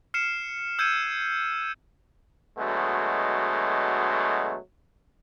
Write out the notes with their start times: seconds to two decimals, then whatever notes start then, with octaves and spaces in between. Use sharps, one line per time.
0.14 F6 C7 C#7 E7
0.79 E6 G6 G#6 C#7 D#7
2.58 B2 D3 F#3 G#3 A3